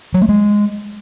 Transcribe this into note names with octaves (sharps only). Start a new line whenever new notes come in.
F#3
A3
G#3